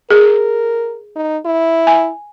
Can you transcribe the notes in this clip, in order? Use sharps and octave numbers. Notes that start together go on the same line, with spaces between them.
G#4 A#4
D#4
E4
G#5